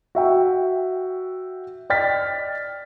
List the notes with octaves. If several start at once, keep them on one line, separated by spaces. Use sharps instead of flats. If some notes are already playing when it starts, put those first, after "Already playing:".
F#4 E5 G5
D5 D#5 G5 F6 A6 B6